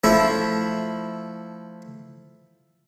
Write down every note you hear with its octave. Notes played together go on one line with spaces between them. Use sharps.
F3 A3 E4